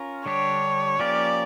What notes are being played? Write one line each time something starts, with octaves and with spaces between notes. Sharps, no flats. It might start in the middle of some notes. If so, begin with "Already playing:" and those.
Already playing: C#4 F4 A#4
D3 G3 D4 G4 C#5
F3 A#3 C#4 G4 A#4 D5